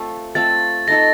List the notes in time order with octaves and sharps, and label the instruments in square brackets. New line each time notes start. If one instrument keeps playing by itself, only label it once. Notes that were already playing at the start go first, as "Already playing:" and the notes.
Already playing: [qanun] A3 C4 F4 A4
[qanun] A3 C4 F4 A4 [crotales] A6
[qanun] A3 D#4 A4 [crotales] A#6